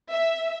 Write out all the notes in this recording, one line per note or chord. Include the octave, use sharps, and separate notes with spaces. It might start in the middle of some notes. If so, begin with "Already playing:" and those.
E5